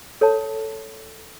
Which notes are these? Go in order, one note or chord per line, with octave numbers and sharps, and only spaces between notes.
A4 C#5 A5